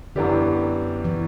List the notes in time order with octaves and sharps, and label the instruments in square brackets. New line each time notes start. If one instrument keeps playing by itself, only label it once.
[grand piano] F#2 E3 B3 D4 G4 [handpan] D3
[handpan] E3